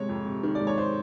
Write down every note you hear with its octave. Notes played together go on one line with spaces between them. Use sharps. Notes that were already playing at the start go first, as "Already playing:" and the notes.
Already playing: C3 G#3 C#5
F2
C3
D#3
G#3 D5
C#5
C5